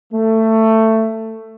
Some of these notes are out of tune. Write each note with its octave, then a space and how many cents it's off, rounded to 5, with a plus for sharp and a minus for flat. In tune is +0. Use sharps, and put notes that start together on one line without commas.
A3 +15